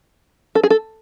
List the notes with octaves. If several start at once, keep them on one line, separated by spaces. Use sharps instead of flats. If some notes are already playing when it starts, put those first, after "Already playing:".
A4
G#4
A4